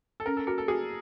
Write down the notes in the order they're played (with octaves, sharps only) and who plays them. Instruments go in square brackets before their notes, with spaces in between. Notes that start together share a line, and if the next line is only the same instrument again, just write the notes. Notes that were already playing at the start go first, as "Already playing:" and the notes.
[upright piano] A4
[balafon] C#4 [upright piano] A#4
[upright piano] A4
[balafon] F#4 [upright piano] A#4
[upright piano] A4
[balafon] F#4 [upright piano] G#4